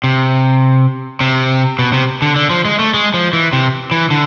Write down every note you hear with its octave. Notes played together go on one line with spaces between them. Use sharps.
C3
C3
B2
C3
D3
D3
F3
G#3
A3
G#3
F3
E3
C3
E3
D3